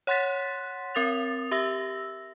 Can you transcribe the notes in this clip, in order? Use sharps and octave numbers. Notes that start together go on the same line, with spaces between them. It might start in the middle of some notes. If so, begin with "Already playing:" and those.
C#5 F#5 C6 F#6 A6 B6
C4 A#4 D#6 A6 F7
G4 E5 E6 A#6